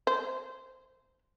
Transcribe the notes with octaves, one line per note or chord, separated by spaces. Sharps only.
C5